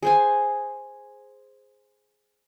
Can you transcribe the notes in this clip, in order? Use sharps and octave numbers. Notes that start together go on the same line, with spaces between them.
G#4 C5 G#5